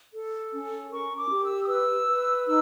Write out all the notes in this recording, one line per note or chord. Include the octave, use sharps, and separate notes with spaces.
A4
C#4
A#4 C#6
D6
G4
E6
D#6
B4 E6
B4
D#4 E6